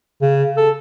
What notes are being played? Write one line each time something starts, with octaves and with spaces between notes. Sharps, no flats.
C#3
A4